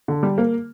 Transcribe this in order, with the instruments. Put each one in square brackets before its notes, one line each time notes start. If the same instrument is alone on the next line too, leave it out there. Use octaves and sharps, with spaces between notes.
[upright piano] D3
G3
A#3